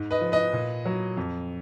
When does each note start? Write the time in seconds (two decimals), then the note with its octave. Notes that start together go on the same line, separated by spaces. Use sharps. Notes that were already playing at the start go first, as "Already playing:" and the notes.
Already playing: G#2
0.11 B4 D#5
0.21 F3
0.32 B4 D#5
0.53 A#2
0.85 F#3
1.17 F2